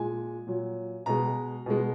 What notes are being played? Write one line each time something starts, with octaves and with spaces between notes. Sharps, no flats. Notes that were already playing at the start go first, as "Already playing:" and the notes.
Already playing: A#2 G#3 G#5
A#2 F#3
B2 G#3 A#5
B2 G#3